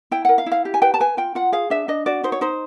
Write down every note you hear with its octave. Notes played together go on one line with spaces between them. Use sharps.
E4 G5
A#4 F#5
F5
E4
F5
G4
G#5
B4 G5
A5
B4 G#5
F4 G5
F4 F#5
G#4 F5
D4 E5
D4 D#5
F#4 D5
D#4 C5
C#5
D#4 C5